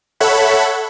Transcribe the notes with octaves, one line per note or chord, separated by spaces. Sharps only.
A4 C#5 E5 F#5 B5